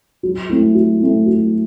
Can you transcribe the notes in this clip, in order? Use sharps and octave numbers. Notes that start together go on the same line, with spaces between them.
F#3
A3 C4 E4
F#3
A3 C4 E4
F#3